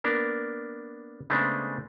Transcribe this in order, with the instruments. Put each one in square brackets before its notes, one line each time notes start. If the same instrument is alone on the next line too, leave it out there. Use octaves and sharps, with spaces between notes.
[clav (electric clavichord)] A#3 B3 D4 A#4
C#3 G#3 A3 B3 C4 D4